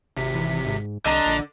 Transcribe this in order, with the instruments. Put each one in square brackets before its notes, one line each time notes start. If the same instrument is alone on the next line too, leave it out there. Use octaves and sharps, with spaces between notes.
[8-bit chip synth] G#1 C3 B6
[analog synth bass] E3
G#2
[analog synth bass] C2 [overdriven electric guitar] D3 [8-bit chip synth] D#5 A#5
[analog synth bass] A#1